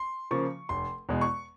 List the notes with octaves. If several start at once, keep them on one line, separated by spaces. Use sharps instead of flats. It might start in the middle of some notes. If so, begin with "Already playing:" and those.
Already playing: C6
C#3 F3 A#3 C#6
F1 C6
E2 B2 G#3
C#6